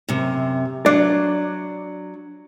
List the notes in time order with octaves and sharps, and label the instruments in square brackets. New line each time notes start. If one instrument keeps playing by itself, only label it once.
[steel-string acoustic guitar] F#2 C3
[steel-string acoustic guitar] F#3 [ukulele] D4 [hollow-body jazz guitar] D5